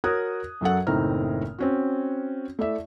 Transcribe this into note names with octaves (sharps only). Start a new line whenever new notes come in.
F#4 A#4 C#5 D#6 F#6 G#6
F#2 F#3 A4 F#5
F#1 A2 D#3 C4 A#5 F6
C4 C#4 F#4
A3 E4 D5 E5